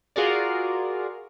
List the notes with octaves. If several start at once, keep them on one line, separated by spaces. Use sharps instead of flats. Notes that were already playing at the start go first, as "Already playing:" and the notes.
F4 F#4 G#4 A#4 D5